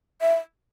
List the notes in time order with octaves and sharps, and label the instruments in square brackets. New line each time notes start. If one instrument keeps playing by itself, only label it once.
[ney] E5